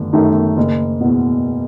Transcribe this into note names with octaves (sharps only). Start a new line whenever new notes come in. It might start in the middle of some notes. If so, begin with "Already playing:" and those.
Already playing: G1 F#2 D#3 A3
F#2 D#3 A3 D#4
F#1
E2 B2